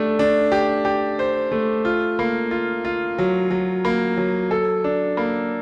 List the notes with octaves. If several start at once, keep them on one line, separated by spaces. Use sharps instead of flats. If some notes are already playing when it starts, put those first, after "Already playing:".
Already playing: A3 D4 G4
D4
G4
G4
C5
A3
F4
A#3
F4
F4
F#3
F#3
A#3
F#3
A4
D4
A#3